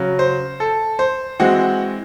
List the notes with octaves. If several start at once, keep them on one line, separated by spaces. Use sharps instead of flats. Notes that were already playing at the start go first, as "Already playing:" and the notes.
Already playing: C#3 F#3
C5
A4
C5
E3 G#3 C4 F#4 F#5